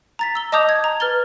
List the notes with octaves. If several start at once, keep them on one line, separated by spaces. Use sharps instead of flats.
A#5 A6 B6
E6 G7
D#5 A5 D6 D#6 G6 F7
G#6
A#5
B4 F6 A6 G7